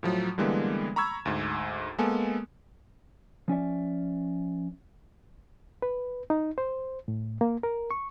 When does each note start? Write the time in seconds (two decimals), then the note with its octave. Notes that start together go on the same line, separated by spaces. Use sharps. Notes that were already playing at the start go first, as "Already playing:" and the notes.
0.03 A2 F3 F#3
0.38 D3 E3 G3 G#3 A#3 B3
0.96 A#5 B5 C#6 E6 G#6
1.25 D2 G#2
1.98 G#3 A#3 B3 A4 G#5
3.48 F3 C#4 D5 E5
5.82 B4
6.30 D#4
6.58 C5
7.08 A2
7.41 A#3
7.63 A#4
7.91 C#6